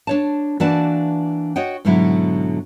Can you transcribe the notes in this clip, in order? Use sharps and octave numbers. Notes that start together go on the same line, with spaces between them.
D4 C#5 A5
E3 A#3 D4 F#4 D5 A5
F#4 C#5 D#5 F#5 G5
G#2 B2 D3 F#3 E4